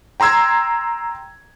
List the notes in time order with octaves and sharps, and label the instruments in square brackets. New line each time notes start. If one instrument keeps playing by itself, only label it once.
[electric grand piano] G5 A#5 C6 E6 G#6